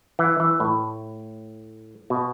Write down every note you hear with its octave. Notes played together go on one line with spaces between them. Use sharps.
E3
E3
A2
B2